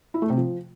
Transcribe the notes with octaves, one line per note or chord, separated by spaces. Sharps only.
E4
A3
C3
F3